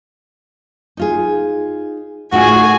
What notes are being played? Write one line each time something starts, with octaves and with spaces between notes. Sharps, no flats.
D#4 F4 G#4
A2 D#4 F4 F#4 G#4 F#5 G#5